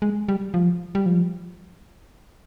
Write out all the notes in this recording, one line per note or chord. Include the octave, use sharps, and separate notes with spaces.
G#3
G3
F3
G3
F3